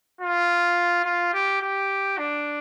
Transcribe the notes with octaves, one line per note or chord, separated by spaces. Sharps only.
F4
F4
G4
G4
D4